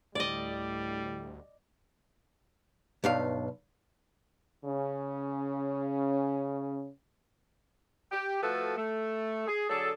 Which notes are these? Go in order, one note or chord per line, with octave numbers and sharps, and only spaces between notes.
D2 A2 G3 D5 D#5
B1 G2 F5
C#3 C#4
G4
F3 A3 F#4 A4 B4
A3
G#4
D3 F#3 G#4 A4